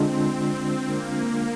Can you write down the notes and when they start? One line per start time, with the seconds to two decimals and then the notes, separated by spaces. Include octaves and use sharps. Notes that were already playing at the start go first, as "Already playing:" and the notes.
Already playing: D3 G#3 C4 D4 F4
0.86 A#3